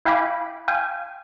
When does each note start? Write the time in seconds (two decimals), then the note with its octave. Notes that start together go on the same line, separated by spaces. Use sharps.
0.05 E4 F5 G5 G#5 B5 D6
0.68 F5 G5 G#5